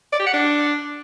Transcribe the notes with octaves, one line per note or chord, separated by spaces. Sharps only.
D5
G4
F#5
D4